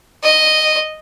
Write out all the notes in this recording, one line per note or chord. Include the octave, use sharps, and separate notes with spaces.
D#5